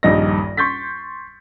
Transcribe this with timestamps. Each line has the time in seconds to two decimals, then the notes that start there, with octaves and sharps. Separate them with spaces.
0.03 D#1 A#1 G2 D#4 A#6
0.57 C6 C#6 G6 A6 B6